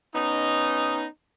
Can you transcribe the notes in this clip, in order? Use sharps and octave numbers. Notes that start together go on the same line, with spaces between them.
B3 C#4 D#4